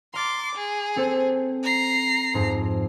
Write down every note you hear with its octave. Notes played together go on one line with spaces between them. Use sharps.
A#5 C6 D6 F6 A6
G#4
C4 A4 C5
A#5 C7
F2 G#2